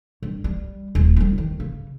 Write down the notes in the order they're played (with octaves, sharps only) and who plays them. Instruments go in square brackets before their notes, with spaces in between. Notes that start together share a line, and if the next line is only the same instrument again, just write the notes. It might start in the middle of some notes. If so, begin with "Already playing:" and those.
[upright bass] G2
G3
D#1
D2 G3
D#3
C#3